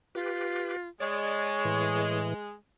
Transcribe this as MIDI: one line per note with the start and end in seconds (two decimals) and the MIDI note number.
0.15 0.88 65
0.15 0.77 67
0.15 0.77 71
1.00 2.52 56
1.00 2.20 73
1.00 1.50 74
1.65 2.34 45
1.65 2.34 52